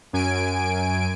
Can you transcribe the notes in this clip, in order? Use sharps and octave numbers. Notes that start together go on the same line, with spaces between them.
F#2 G#5 D7